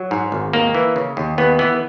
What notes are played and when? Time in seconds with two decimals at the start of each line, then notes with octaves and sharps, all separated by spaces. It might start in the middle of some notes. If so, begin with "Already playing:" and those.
Already playing: F#3
0.11 G#2
0.32 G#1
0.53 D#2 A#3
0.75 E3
0.96 C#3
1.17 D#2
1.38 D#2 B3
1.59 E3 B3